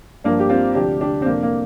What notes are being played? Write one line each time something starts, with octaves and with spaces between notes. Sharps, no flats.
G2 F3 A#3 D4
G4
C4 F4
D2 C3 F3 D4 G4
D4 G4
C4
F2 C3 F3 A#3 D4
A#3